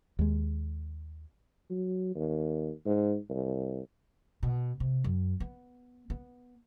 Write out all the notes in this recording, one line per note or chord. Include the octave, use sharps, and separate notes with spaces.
D#2 G#3
F#3
D#2
G#2
C2
B2
C3
F#2
B3
B3